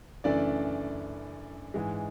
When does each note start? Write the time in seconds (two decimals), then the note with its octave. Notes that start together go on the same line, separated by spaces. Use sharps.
0.24 F#2 C#3 E3 A3 D4 D5
1.74 G#2 E3 G#3